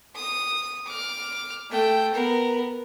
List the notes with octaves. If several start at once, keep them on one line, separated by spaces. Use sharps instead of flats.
D#6
D6 F6
A3 G5
B3 A#4